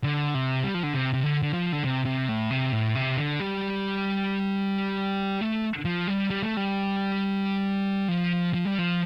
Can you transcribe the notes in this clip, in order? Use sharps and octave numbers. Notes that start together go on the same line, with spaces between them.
D3
C3
G3
F3
D3
C3
C3
D3
D3
F3
D3
C3
C3
A2
C3
A2
C3
D3
G3
A3
F3
G3
G3
A3
G3
F3
F3
G3
F3